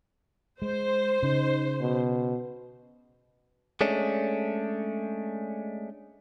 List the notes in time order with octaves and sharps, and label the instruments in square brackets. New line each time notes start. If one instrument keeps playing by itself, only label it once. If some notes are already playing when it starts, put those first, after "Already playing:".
[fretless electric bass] G#3 [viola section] C5
[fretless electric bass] C#3 [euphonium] D#4
[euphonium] B2
[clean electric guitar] G#3 A3 C#4 D4